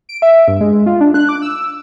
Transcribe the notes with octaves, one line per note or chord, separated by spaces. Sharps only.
D7
E5
G2
G#3
F4
D4
F#6
D6
E6